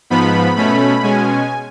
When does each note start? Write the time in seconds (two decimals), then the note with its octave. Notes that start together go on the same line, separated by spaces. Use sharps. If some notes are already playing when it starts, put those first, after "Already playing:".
0.10 G#2 F3 B3 B5
0.56 B2 A3 C#4 B5
1.03 B2 G#3 C#4 G#5